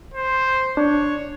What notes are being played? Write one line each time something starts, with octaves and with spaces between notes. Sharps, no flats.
C5
D4 C#5